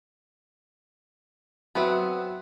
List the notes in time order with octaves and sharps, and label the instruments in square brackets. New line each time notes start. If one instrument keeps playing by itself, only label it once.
[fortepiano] F#3 E5 [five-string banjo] B3 C4 B4